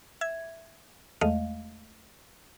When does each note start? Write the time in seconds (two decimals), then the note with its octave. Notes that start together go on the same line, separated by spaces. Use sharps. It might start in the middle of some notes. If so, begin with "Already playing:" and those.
0.21 E5 G#6
1.21 E2 G#3 A3 D#5 F5